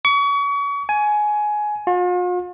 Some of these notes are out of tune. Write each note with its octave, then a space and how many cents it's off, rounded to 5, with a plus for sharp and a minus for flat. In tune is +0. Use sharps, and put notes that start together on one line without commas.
C#6 +35
G#5 +15
F4 +45